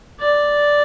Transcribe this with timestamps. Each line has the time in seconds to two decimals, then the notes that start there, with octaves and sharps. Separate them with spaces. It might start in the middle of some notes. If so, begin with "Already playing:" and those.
0.21 D5